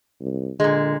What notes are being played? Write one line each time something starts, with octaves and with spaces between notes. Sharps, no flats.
C2
A#2 D3 G#3